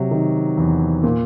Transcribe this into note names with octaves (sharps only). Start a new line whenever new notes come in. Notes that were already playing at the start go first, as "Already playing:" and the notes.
Already playing: C3 F#3
D#3
E2
A#2